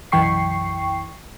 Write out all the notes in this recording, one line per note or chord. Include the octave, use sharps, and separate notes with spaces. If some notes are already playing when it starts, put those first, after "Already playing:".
B1 F#2 E3 G5 C#6 C7